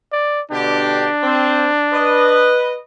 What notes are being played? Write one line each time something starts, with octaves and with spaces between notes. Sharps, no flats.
D5
B2 D3 D4 G4
C4
B4 D#5